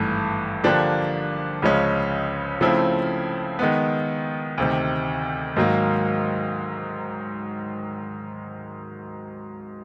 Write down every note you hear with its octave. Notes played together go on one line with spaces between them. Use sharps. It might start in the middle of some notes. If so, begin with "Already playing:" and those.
Already playing: G#1 G2 E3 A3
D3 F3 A#3 D4 G4
C#2 C#3 F3 G#3 C#4
C#3 F3 A3 C4 E4
D#3 G#3 B3
D2 C3 D#3
G#2 D#3 F#3 A#3